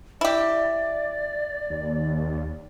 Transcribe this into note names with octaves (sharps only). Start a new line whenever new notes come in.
E4 G4 D5
D#2